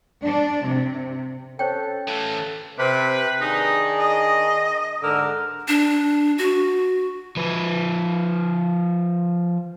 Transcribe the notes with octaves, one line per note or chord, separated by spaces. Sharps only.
D4
C3
C#4 G4 A4 C5 C#5 G5 C#6
A2 E3 A4 F5
C3 B4
D#3 D4 D#4 G#4
D#5
G#2 D3 A#4
D4
F#4
F3 B4